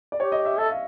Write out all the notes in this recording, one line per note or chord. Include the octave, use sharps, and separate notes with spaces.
D5
G4 C#5
D#5
E5
A4 E5
F5